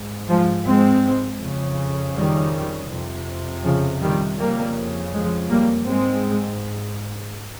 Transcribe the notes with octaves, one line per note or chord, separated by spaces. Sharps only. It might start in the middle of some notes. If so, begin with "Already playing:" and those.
Already playing: G#2
F3 G#3
G#3 C4
F2 C#3
D#3 G3
F2 C3
C#3 F3
D#3 G3
F2 C#3 G3 A#3
F3 G#3
G3 A#3
G#2 G#3 C4